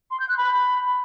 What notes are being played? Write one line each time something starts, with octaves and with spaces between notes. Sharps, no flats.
C6
G6
F#6
B5